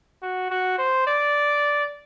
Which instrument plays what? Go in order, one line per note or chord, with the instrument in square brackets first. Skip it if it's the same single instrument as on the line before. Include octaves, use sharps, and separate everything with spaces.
[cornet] F#4
F#4
C5
D5